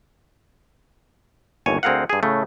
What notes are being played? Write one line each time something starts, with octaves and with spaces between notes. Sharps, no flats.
G1 D#2 C#5 G#5
D2 C4 G#4 A#4 F5 F#5
G2 G#4
A2 C#3 A3